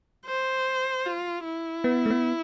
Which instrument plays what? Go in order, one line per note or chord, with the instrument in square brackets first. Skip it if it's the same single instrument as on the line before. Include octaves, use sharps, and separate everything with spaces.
[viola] C5
F4
E4
[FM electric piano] B3
A3
B3